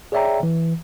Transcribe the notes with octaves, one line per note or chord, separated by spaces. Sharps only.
G#4 C#5 D5 E5 G5 A#5
E3